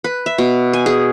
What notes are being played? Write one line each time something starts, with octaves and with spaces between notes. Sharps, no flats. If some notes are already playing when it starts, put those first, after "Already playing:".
B4
E5
B2
G#5
G#4